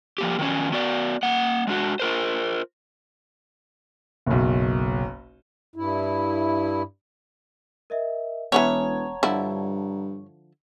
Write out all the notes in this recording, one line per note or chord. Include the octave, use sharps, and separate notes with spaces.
F3 A#3 G4
D#3 F3 F#3 C#4
B3 F#4 D5
A#3 F#5
G#3 D4 F#4
F4 A#4 C5
F#1 B1
G2 E4
A#4 D#5 E5
E1 E3 B3 C#4 C#5 F#5 A5 A#5
G2 D3 F3 E4